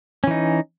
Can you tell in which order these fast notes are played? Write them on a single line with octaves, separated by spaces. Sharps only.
C#4 E3 D#4